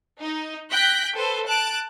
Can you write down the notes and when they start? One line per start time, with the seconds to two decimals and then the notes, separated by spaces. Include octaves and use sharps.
0.22 D#4
0.70 G5 F#6 A#6 B6
1.15 A4 B4 C5
1.46 A5 F#6 D7